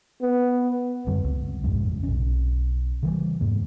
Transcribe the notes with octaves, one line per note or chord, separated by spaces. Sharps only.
B3
F#2 D3 G3 C4
C#2
A#1 F2 G#2 C#3
B1 C#4
C#3 E3 G3
F2 G#2 A#3